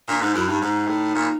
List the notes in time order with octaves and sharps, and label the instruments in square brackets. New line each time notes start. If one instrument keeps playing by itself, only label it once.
[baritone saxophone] A#2 [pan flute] D4
[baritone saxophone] G#2 [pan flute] D#4
[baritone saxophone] F#2 [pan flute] E4
[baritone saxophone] G2 [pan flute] D#4
[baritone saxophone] G#2 [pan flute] D#4
[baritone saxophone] A2
A#2